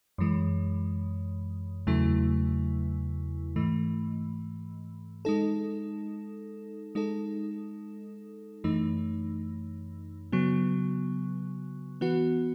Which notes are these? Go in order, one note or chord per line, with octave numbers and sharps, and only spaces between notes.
F#2 E3 G#3
E2 C#3 F#3 A3 E4
G#2 E3 A3
G#3 D#4 A4
G#3 D#4 A4
F#2 E3 A3 D#4
C#3 F#3 B3
E3 B3 F#4